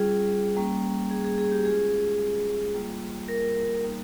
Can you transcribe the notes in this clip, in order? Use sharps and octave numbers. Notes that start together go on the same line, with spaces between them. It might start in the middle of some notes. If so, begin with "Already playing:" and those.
Already playing: G3 C#4 F4 G#4
G3 A#3 C#4
G#4
G#4
G#4
G4
G#3 C#4 F4 G#4
G3 A#3 F4
A#4
G3 A#3 D#4